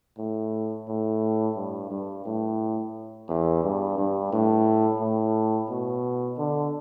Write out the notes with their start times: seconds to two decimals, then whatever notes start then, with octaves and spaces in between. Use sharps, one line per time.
0.18 A2
0.88 A2
1.56 G2
1.90 G2
2.25 A2
3.28 E2
3.63 G2
3.98 G2
4.32 A2
5.00 A2
5.69 B2
6.38 D3